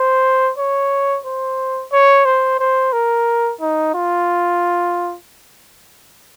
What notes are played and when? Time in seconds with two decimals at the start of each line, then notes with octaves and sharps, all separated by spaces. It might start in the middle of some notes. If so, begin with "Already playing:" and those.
Already playing: C5
0.58 C#5
1.25 C5
1.92 C#5
2.25 C5
2.60 C5
2.93 A#4
3.61 D#4
3.95 F4